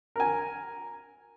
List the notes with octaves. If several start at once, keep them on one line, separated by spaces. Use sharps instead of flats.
A#4 G#5